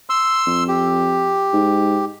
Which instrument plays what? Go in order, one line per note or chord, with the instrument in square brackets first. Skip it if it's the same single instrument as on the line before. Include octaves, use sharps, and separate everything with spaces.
[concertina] C6 E6
[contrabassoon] F2
[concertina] G4
[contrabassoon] G#2